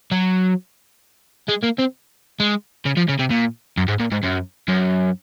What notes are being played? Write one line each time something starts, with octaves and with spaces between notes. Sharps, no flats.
F#3
G#3
A#3
C4
G#3
C#3
F3
C#3
C3
A#2
F#2
G#2
A#2
G#2
F#2
F#2